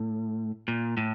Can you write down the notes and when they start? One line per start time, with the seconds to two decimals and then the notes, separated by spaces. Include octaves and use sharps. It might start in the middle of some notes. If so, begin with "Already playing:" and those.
Already playing: A2
0.68 A#2
0.97 A2